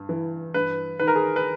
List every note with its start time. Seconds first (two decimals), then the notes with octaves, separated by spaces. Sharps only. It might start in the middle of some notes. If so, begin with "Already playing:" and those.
Already playing: G2
0.09 E3
0.54 G2 B4
0.99 D#3 B4
1.07 A#4
1.15 G#4
1.36 B4